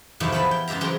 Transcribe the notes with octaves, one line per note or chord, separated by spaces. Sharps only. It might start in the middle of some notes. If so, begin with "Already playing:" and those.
F2 A2 C3 D#3 E3 F#3
E3 B3 E4 F5 A5 B5
G5
C#3 G#3 G4 E5 A#5
E3 F#3 C4 G4 G#4 A#4